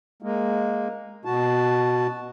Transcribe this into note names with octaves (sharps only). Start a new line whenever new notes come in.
G#3 A#3
B2 F#4 A5